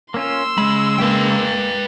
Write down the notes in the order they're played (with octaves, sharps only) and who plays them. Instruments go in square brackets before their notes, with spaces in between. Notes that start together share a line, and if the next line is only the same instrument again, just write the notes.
[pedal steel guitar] A#3 C#4 F4 [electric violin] C6 E6
[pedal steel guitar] C#3 B5 [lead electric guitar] G#3
[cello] G#3 A#3 [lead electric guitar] B4 G5